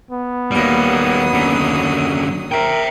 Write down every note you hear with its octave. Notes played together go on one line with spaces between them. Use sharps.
B3
D#2 F#3 G3 A#3 D#6
F#2 D3
A#4 E5 G5